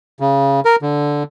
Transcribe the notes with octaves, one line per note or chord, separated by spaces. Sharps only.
C#3
A#4
D3